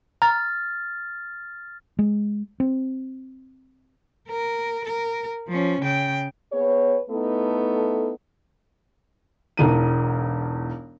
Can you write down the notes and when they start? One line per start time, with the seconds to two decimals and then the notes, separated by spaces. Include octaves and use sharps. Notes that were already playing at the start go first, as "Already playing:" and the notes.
0.22 A#5 F6 A6
1.99 G#3
2.60 C4
4.29 A#4
4.85 A#4
5.48 F3 C#4
5.82 C#3 G5
6.53 B3 G#4 B4 C#5
7.10 A3 B3 D#4 E4 A4
9.57 E1 B1 E2 D#7